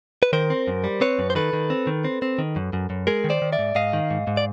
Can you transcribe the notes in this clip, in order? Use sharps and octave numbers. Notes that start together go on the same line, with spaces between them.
B4
D#3 A#4 C5
C4
F#2
G3
C4 B4 C#5
F#2
C5
D#3 A4 B4
D#3
C4
D#3
C4
C4
D#3
F#2
F#2
F#2
G#3 G#4 A#4
D#3
C5 D5
D#3
D5 E5
G#2
G#2 D#5 F5
D#3
G#2
G#2
D5